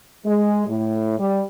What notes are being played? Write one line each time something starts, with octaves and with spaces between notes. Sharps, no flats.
G#3
A2
G3